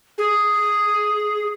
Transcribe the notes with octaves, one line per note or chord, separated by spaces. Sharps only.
G#4